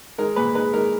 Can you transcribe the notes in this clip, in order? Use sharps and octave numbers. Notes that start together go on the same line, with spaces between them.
G#3 A#4
A#2 B4
G#3 B4
G#3 A#4